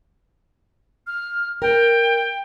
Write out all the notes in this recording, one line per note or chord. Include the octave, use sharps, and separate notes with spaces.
F6
A#4 G5